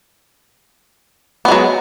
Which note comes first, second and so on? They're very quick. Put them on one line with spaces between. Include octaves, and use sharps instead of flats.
B3 G#3 F#3